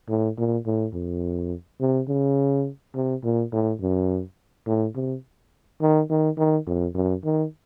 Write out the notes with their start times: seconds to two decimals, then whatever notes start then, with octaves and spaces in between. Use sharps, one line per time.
0.09 A2
0.37 A#2
0.66 A2
0.93 F2
1.80 C3
2.08 C#3
2.95 C3
3.24 A#2
3.52 A2
3.81 F#2
4.66 A2
4.95 C3
5.81 D#3
6.10 D#3
6.37 D#3
6.67 F2
6.95 F#2
7.24 D#3